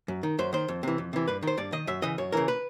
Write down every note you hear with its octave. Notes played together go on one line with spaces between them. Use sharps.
F#2
D#3
F#2 C5
D#3 C5
F2
C3 E3
F2
C3 E3
G2 B4
D#3 C5
G2 D5
D#3 D#5
F#2 E5
C#3 E3 D#5
F#2 C#5
C#3 E3 A#4
B4